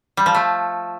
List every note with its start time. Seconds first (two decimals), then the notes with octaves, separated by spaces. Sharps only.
0.17 G3
0.26 F3
0.35 A3